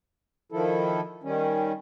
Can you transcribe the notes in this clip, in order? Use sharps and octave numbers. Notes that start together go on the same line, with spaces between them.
D#3 F3 E4 A4
D#3 G3 C#4